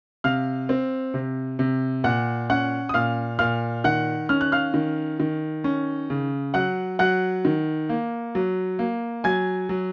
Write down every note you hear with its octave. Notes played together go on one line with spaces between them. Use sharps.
C3 F5 F6
C4
C3
C3
A#2 F#5 F#6
C#4 F#5 F#6
D#6
A#2 F5 F6
A#2 F5 F6
D#3 F#5 F#6
C#4 F6
F#6
F5 F6
D#3
D#3
C#4
C#3
F#3 F#5 F#6
F#3 F#5 F#6
D#3
A#3
F#3
A#3
F#3 G#5 G#6
F#3